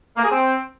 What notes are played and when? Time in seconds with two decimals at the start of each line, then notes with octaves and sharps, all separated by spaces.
0.16 A#3
0.23 G#4
0.30 C4